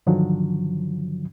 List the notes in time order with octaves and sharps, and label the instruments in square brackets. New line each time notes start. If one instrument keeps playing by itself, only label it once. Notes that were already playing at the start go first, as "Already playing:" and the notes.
[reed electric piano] G2 D3 D#3 F3 F#3